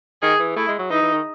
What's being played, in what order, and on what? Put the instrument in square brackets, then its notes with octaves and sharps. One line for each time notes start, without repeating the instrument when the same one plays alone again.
[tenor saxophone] D#3 [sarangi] G#4
[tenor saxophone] E3
[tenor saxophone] A3 [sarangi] E4
[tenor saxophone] G#3
F#3
[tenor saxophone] E3 [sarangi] D#4
[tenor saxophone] E3
D#3